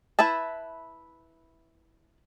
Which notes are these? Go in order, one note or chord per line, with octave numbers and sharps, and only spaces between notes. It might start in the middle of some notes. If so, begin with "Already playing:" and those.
E4 B4 E5 A5